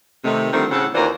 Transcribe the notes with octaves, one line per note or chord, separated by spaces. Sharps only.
C3 D#3 A3
D3 D#3 F3 G3 A3 C4
A2 C#3 C4 A4 F#5
D#2 E3 F4 A#4 C5 D5